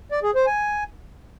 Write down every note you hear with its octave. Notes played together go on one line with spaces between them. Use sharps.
D5
G#4
C5
G#5